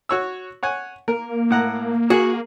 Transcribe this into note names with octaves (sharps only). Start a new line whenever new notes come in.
F#4 C#5 E6
C#5 F#5 G#5
A#3 A#4
A2 F#5 A#5
F#4 G#4